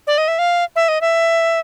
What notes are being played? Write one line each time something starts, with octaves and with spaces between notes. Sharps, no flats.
D5
D#5
E5
F5
E5
D#5
E5